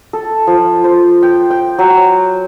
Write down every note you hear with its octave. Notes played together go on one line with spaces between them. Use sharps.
A4
F3
C5
G5
G5
F#3